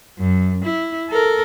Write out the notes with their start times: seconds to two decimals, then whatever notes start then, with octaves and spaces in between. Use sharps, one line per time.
0.19 F#2
0.64 E4
1.10 A4 A#4